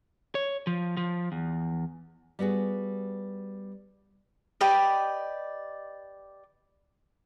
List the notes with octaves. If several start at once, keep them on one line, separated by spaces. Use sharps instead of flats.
C#5
F3
F3
E2
G3 B3 F#4 G#4
G4 B4 D5 D#5